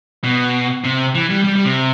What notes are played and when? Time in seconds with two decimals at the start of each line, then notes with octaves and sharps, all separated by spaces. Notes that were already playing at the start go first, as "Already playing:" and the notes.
0.24 B2
0.84 C3
1.15 E3
1.30 G3
1.44 G3
1.55 G3
1.65 C3